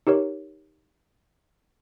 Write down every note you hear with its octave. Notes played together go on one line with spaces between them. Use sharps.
D#4 G4 A#4 C#5